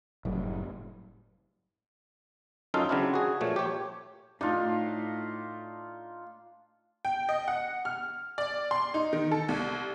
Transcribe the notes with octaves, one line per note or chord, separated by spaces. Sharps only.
F#1 A2 F#3 G3
F#2 C#4 D#4 F4 A4 F5
C#3 F#3 C4 D4 E4
F#4 G#4
A#2 F3 A3 C#5
G4 C#5
A2 D4 D#4 F4
G5
D#5
F#5
F6
D5
C6
D#4
D#3
A4
C2